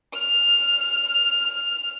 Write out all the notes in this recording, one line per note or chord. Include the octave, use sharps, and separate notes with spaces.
F6 F7